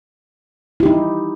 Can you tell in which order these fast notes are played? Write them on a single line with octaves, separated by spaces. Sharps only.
E4 G4 D#4